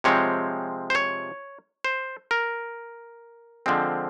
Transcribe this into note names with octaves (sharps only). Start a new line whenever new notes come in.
C3 F3 G#3 C4 C#5
C5
C#5
C5
A#4
D3 F3 G#3 C4